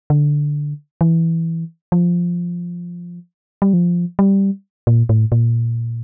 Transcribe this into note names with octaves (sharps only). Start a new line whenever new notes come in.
D3
E3
F3
G3
F3
G3
A#2
A2
A#2